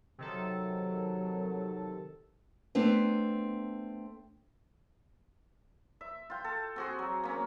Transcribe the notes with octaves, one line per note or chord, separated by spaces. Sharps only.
C3 D#3 F#3 A4
A3 B3 C4 D4
E5
F4 G5
A4
C4 F#4 G#4
F#3
A#3 C#4